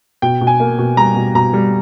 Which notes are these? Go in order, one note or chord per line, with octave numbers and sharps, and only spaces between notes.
B2 G5
B2
G#5
A#3
B2
G3 A#5
B2
B2 A#5
G3